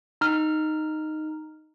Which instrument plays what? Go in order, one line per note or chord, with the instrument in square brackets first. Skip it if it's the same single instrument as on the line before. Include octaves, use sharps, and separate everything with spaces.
[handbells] D#4 F6